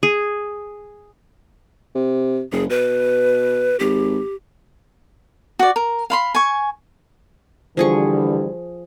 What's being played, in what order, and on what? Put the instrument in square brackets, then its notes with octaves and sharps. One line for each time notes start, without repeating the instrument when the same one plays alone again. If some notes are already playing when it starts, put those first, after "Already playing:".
[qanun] G#4
[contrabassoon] C3
[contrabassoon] F#1 [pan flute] G#4
[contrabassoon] B2 [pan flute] B4
[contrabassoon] G#1 [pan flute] G4
[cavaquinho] F#4 D5
A#4
F5 B5 C6
G#5 C#6
[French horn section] D3 E3 G3 [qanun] F3 G#4 C#6